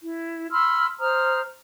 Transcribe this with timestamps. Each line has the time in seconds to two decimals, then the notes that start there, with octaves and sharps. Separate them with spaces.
0.02 E4
0.51 B5 C6 E6 F6
0.99 C5 A#5 D#6 F6